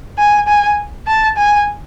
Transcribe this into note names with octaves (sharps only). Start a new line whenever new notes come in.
G#5
G#5
A5
G#5